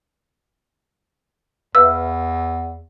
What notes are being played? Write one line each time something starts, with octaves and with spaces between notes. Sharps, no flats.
E2 B4 E5 F5 E6